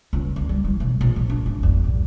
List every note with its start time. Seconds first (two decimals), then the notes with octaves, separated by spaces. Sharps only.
0.13 C#2
0.36 D2
0.49 G3
0.64 E3
0.80 B1
1.01 A#1
1.16 F3
1.30 D4
1.46 G#1
1.63 E2
1.84 A#1